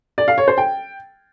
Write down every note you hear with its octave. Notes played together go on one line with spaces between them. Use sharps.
D5
F5
C#5
C5
G5